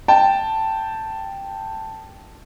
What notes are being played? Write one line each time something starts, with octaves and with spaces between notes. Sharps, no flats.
G5 A5